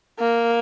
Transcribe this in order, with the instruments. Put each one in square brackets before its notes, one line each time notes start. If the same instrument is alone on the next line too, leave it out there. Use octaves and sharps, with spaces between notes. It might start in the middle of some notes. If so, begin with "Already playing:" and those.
[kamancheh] A#3